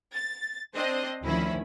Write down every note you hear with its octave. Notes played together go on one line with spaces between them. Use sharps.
A6
C4 D4 C5 D#5
D2 D#3 F3 C#4 E4 B5